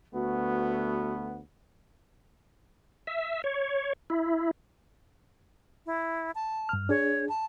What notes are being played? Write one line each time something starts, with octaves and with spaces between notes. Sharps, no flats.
D2 A3 B3 F#4
E5
C#5
E4
E4
A5
G2 F6
D4 G#4 C#5
A5